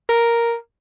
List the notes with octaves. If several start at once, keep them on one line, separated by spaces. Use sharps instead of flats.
A#4